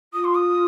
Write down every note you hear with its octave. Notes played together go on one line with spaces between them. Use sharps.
F4 D#6
C6
D#6